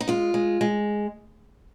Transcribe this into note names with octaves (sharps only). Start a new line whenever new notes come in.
D#4
G#3 F4
G#3
G#3